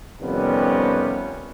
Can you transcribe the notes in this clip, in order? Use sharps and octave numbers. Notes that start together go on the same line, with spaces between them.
F2 C3 D#3 G3 B3 C#4